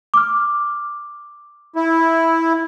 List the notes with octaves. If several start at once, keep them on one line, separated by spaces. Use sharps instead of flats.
D6 F6
E4